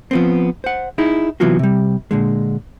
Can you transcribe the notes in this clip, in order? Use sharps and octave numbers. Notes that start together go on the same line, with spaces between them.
F3 B3 C4
C5 F#5
D#4 E4 G#4
C3 E3 F#3 B3 F4 F#4
C3 G3
A#2 D3 G#3